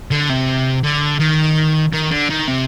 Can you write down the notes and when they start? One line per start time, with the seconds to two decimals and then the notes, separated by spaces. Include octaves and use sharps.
0.11 D3
0.29 C3
0.83 D3
1.20 D#3
1.93 D#3
2.11 D3
2.30 D#3
2.47 C3